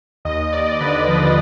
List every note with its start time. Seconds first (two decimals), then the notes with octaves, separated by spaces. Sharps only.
0.25 D#2 D#5
0.52 D#2 D5
0.80 D3 B4
1.08 F3